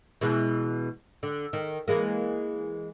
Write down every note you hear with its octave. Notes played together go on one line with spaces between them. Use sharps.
B2 E3 G#3
D3
D#3
E3 G#3 A#3